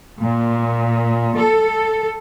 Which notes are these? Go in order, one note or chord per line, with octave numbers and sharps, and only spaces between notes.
A#2
A4